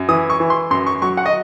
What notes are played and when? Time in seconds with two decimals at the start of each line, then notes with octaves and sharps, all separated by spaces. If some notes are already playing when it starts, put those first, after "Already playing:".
Already playing: F#2
0.09 E3 D#6
0.30 C#6
0.40 E3
0.50 C6
0.70 F#2 C6
0.86 C#6
1.02 F#3 C#6
1.17 F#5
1.26 D#5